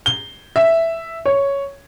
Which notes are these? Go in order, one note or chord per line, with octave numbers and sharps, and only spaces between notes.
G7
E5
C#5